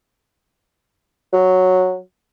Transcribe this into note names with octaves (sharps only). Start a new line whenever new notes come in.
F#3